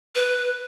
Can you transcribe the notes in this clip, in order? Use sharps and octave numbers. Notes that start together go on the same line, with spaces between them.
B4